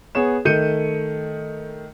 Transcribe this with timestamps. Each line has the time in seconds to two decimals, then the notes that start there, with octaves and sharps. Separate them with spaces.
0.15 B3 G#4 C#5 E7
0.45 D#3 A3 G6 C#7 D#7